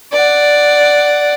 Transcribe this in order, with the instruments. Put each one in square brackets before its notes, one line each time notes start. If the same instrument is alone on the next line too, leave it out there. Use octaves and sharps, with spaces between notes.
[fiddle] D5 F#5